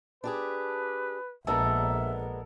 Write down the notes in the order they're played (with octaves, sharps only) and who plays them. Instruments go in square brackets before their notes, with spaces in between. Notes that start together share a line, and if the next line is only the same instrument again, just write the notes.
[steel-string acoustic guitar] D4 G4 G#4 [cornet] B4
[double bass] A#1 [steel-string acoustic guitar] G#3 B3 D4 [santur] A4 A#4 [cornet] E5